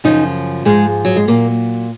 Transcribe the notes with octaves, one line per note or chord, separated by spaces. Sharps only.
F#2 C#3 F3 D#4
G#2 F3 G#3
F#3
G#3
A#2 F#3 A#3